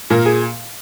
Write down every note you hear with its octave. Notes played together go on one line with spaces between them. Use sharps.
A#2 A#4
G#4